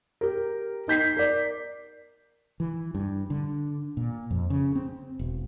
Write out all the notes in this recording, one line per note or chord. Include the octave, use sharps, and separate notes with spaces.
G4 A#4
D#4 G6 B6 C7
A#4 D5
E3
G2
D3
A#2
F2
C#3
C4
E1